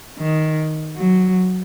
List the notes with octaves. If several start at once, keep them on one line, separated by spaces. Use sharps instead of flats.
D#3
F#3